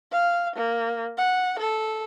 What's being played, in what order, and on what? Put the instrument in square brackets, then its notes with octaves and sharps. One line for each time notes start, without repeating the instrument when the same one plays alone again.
[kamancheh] F5
A#3
F#5
A4